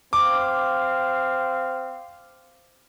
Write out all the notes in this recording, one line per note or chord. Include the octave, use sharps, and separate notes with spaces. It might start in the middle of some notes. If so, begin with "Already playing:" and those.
C4 F5 D6